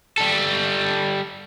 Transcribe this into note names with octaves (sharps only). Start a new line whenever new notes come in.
G3 A4